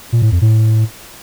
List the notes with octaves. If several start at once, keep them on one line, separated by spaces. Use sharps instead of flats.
A#2
A2
F2
A2